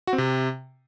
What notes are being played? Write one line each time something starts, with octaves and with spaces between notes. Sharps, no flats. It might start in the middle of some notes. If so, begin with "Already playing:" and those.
F#4
C4
C3